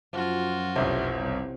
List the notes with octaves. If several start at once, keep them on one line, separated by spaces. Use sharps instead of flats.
F#2 F3 F4 F#4
F1 B1 C3 E3 C#4
C2